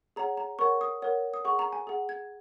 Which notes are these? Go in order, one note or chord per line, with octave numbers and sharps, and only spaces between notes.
G#4 C#5 F#5 A#5
A#5
A#4 C#5 F#5 C#6
D#6
A#4 C#5 F#5
D#6
G#4 F#5 C#6
A#5
G#5
G#4 F#5
G#6